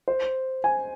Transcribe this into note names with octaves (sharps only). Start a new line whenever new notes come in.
C5
G#5